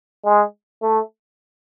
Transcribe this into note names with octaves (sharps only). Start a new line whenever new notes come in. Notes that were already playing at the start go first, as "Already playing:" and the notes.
G#3
A3